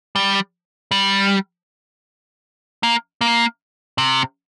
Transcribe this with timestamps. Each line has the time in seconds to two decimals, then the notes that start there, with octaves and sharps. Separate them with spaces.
0.16 G3
0.91 G3
2.83 A#3
3.21 A#3
3.98 C3